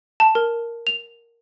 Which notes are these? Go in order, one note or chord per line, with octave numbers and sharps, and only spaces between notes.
A5
A#4
F7